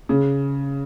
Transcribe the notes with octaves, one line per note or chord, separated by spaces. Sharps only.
C#3